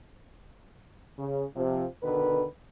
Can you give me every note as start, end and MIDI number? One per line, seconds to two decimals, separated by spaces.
1.19 1.44 49
1.56 1.85 48
1.56 1.85 53
2.03 2.44 47
2.03 2.44 50
2.03 2.44 51
2.03 2.44 71